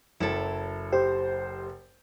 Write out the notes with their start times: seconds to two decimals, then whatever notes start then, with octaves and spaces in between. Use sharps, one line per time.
0.20 F#1 F#3 E4 A4
0.92 G4 C5